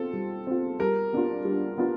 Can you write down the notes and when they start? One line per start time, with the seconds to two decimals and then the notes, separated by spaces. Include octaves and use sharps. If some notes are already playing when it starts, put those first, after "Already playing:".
Already playing: C4 F4 A4
0.13 G3
0.47 C4 F4
0.80 G3 A#4
1.13 B3 D4 F4
1.45 G3
1.78 B3 D4 F4